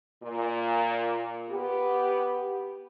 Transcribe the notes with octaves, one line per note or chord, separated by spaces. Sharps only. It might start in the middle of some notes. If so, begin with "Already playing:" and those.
A#2
B3 G4